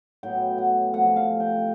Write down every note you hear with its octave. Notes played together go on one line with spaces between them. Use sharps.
A2 F#3 B3 G5
F#5
C3 F3 A3 F#5
F5
G5